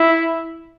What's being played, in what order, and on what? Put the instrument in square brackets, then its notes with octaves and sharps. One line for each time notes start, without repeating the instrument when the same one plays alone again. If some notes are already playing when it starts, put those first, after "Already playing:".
Already playing: [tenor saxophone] E4